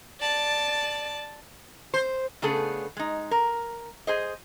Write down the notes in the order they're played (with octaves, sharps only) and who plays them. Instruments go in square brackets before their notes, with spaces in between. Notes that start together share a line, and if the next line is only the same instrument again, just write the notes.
[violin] D5 A5
[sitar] C5
[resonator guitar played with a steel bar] C#3 A3 B3 D4 G#4 A4
G#3 D#4
A#4
G#4 C5 D#5